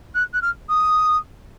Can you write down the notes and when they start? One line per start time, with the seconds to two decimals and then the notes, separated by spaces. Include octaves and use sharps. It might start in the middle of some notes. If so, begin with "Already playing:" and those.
0.14 F#6
0.33 F#6
0.42 F6
0.69 D#6